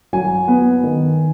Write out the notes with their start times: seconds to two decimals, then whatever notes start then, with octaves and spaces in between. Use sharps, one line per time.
0.13 F#3 G#5
0.48 B3
0.84 D#3